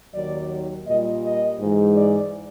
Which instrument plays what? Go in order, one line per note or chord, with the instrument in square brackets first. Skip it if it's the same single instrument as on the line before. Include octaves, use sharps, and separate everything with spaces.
[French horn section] D#2 D#3 F#3 D5
A#2 G3 D#5
D#5
G#2 E3 G#3
D5